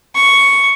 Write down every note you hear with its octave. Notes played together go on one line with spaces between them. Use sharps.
C#6